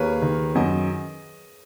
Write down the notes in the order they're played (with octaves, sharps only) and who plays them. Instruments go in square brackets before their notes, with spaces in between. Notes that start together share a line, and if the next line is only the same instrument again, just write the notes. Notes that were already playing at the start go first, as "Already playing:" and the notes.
Already playing: [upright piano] D#2 A#3 [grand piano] G#4 A#4 B4 C#5
[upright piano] D#3
[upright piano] F#2 [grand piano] D#5